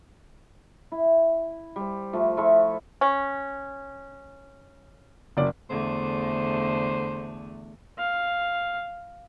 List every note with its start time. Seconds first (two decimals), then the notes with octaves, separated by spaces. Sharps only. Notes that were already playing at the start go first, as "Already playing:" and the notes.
0.92 E4
1.76 G3 C5
2.13 F3 A3
2.37 F3 E4 A4 C#6
3.01 C#4
5.37 F#1 D5
5.70 E2 D3 A3 C5
7.98 F5